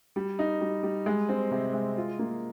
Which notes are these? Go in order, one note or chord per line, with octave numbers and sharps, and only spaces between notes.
G3
D#4
G3
G3
G#3
C4
C3
G#3
F4
A#3